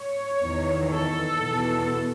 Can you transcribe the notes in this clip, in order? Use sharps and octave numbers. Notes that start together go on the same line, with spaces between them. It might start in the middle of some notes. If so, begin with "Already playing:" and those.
Already playing: C#5
E2 D#3
A4
E2 B2